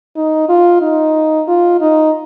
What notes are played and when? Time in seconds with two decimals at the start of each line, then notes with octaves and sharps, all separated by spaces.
0.16 D#4
0.49 F4
0.82 D#4
1.48 F4
1.81 D#4